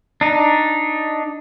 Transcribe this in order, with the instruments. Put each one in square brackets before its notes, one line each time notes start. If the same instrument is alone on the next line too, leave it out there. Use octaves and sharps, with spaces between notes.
[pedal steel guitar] D4 D#4